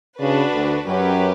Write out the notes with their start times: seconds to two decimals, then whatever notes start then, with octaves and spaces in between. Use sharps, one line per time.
0.20 C#3 D4 F#4 B4
0.53 D2 D3
0.86 F#2 F#3 C#4 G4 B4